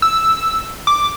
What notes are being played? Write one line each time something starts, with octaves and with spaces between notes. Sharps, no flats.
E6
D6